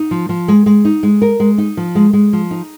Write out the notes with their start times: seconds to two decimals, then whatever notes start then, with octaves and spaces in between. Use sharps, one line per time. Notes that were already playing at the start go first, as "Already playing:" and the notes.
Already playing: D#4
0.11 F3
0.29 F3
0.48 G#3
0.66 G#3
0.85 D#4
1.03 G#3
1.22 A#4
1.40 G#3
1.58 D#4
1.77 F3
1.95 G#3
2.13 G#3
2.33 F3
2.51 D#4